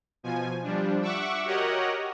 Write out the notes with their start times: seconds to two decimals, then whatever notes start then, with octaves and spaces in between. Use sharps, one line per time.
0.23 B2 F3 G#5
0.63 F3 G3 D4
1.02 E5 F#5 C#6 D6 E6
1.45 F#4 G4 A#4 C#5 D#5 F#5